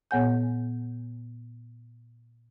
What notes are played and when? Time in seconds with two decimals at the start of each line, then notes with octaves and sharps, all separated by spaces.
0.11 A#2 B3 C#5 F#5 G#5 G6